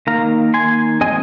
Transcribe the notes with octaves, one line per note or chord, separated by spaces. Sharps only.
D#3 A#3 F5 A#5
G#5 C6
F3 G#3 C4 D#5 G#5